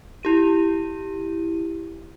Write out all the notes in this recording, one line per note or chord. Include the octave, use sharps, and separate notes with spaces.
E4 G4 D#7